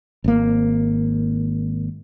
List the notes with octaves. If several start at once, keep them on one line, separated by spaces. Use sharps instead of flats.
G#1 A#3